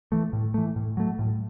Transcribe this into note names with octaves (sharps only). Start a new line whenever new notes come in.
E3 A3
A2
E3 A3
A2
F#3 A3
A2